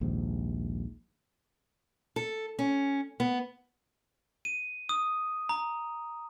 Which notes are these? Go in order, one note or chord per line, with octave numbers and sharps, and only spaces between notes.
A#1 D#2 G#2
A4
C#4
B3
D#7
D#6
A#5